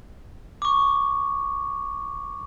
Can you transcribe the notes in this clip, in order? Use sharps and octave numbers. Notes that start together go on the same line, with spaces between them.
C#6 D6